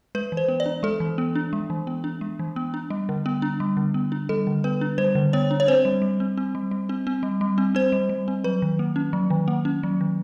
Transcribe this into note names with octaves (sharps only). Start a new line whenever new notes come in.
G#3 B4
E3
C5
B3
D5
D4
G#3 A4
E3
B3
D4
G#3
E3
B3
D4
G#3
E3
B3
D4
G3
D3
B3
D4
G3
D3
B3
D4
G3 A4
D3
B3 B4
D4
G3 C5
D3
B3 C#5
D4
C#5
C4 C5
G3
G3
C4
C4
G3
G3
C4
C4
G3
G3
C4
C4 C5
G3
G3
C4
F#3 B4
D#3
A#3
C#4
F#3
D#3
A#3
C#4
F#3
D#3